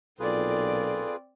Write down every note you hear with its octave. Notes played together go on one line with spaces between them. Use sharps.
B1 A#2 C4 F4 G#4 A4 B4 D5